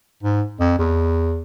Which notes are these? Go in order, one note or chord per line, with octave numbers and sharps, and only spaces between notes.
G#2
F2
E2